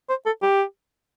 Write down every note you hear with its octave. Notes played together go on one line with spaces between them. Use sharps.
C5
A4
G4